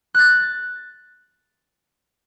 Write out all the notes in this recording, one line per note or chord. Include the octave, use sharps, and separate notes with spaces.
F#6 A6